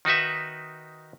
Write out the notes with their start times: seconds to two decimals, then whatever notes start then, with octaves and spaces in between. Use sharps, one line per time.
0.05 D#3 D#4 F#4 B4 E5